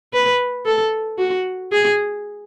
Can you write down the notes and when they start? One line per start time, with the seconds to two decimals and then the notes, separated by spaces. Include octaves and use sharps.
0.13 B4
0.66 A4
1.18 F#4
1.72 G#4